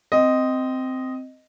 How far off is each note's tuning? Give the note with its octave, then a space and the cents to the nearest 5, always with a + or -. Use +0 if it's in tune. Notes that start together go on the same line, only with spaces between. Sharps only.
C4 -10 D#5 +0